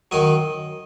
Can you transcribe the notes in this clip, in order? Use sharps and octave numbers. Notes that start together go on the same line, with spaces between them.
F#2 D#3 F#3 D#5